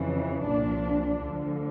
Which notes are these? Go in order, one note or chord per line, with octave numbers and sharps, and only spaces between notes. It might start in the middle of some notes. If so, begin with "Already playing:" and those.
Already playing: F2 C#3 E3
C2 A#2 F3 D4
D2 D3 F3